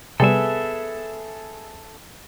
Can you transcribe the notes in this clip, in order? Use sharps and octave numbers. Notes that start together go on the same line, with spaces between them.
C3 G3 B3 G#4 A4 E5